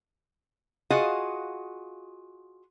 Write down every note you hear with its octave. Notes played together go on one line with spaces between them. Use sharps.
F4 F#4 G#4 D#5 F5 F#5